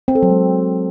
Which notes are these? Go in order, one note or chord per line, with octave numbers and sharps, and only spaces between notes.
C4
A4
F#3
G#3